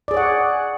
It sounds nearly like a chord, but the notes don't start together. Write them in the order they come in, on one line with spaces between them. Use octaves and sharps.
D5 G#4 C#5 F#5